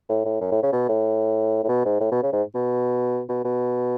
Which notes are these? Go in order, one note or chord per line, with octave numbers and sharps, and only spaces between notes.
A2
A2
F#2
A2
C#3
B2
A2
A2
B2
G#2
A2
B2
C#3
G#2
B2
B2
B2